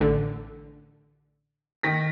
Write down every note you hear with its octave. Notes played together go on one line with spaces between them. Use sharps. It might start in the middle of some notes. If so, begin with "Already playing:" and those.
A1 D3
D#3 A#6 B6